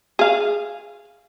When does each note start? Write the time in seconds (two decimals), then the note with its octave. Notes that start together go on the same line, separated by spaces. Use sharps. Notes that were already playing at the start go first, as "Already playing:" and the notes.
0.19 G#4 F5